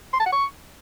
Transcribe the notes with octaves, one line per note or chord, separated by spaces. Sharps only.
C6
A5
F#5
C#6